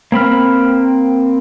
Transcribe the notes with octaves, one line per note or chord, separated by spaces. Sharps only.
A#3 C4 B5 F6